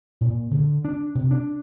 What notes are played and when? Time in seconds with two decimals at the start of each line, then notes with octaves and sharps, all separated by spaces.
0.21 A#2
0.51 D3
0.85 D4
1.15 C3
1.31 D4